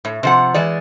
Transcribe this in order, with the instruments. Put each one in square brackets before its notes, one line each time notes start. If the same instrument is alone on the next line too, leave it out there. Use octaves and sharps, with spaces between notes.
[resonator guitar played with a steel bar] A2
C3 F3 F#5
E3 G#3 D5